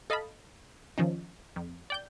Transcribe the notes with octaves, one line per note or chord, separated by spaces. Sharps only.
A4 D#5 F5 A5 B5
D#3 F3 C#4 D#4
F2
D5 G5 G6